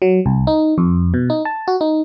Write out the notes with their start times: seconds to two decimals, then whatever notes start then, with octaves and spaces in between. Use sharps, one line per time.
0.02 F#3
0.26 C2
0.47 D#4
0.78 F2
1.14 B2
1.30 D#4
1.45 A5
1.68 F#4
1.81 D#4